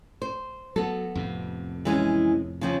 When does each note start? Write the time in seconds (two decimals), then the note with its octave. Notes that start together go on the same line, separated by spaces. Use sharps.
0.22 C5
0.76 F#3 B3 A4
1.15 F2 A2 C3
1.85 E3 G#3 C#4
2.61 C#3 F3 C4